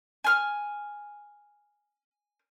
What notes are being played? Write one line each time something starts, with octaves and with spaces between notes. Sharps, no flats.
G#5 F6